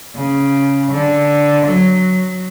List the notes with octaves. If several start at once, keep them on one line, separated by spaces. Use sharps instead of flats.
C#3
D3
F#3